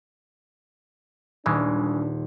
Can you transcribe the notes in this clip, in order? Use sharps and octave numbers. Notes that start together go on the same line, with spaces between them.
D#1 C#3 E3 G#3 D4